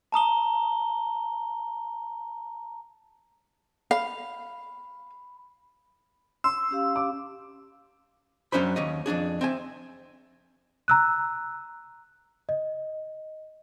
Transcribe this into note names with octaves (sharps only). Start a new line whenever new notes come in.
A5 A#5 D#6 G7
F5 B5
C6 E6
C#4 G4 F5
D6
F#2 F#3 C#4 D4 C5 B5
D#2 C#4 D#5
F2 A#2 D4 G#4
C4 E5 G#5
A#5 E6 F#6
D#5